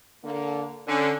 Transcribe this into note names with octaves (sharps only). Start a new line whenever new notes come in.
D3 A#3
D3 C#4